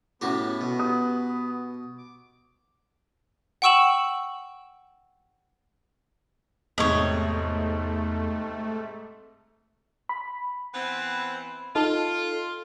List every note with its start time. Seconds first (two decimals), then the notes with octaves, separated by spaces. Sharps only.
0.21 A2 B3 C#4 E4 F#4 G4 B4
0.61 B2
0.79 G4 D#6
1.98 D6
3.62 F#5 G5 C#6 E6 E7 F#7
6.78 E2 G#2 C3 A3 C#5 D#5
10.09 B5
10.74 E3 B3 C4
11.75 D#4 F4 A4